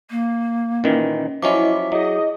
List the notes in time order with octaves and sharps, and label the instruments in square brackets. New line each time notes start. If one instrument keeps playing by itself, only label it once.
[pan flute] A#3
[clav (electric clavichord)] A#2 D#3 E3 [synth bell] C#4
[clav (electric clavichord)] F3 F#3 C#4 [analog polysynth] E4 [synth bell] D#5 D6 [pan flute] E5
[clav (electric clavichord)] F#3 [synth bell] E4 G#4 [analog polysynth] D#5